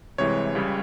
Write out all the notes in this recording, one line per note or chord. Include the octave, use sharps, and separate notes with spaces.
C2 C3 E3 G#3 C#5
C#2 C#3 G3